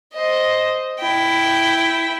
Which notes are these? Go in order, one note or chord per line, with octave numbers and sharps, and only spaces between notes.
C5 D#5
E4 G5